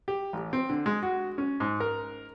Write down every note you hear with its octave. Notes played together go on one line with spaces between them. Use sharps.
G4
A1
C4
D3
G#3
F#4
C#4
G#2
A#4